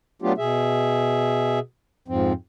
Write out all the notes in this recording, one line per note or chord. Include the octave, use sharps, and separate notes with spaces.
F#3 A3 B3 D4 F4 G4
B2 G#4 E5
F2 G#2 F3 C4